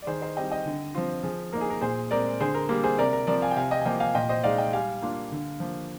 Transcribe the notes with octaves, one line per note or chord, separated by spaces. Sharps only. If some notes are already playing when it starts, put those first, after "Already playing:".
D5
D#3 G#4 C5
C5 D#5
G3 C4 D#4 D#5 G5
D#5 G5
D3
F3 C4 F4
F3 G#4
A#3 D#4 A#4
G#4
A#4
A#2 G#4 C5
G#3 C4 A#4 D5
D3 G#4 C5
A#4
G3 A#3 A#4
G#4 C5
C3 A#4 D5
A#4
F3 C4 A#4 D5
F5 G#5
G5
C3 F5 G#5
D#5 G5
G#5
F3 A#3 D#5 G5
F5 G#5
A#2 D#5 G5
C5 D#5
G#3 D#4 D5 F5
D#5 G5
G3 F5 G#5
A#3 D4 F4
D3
F3 A#3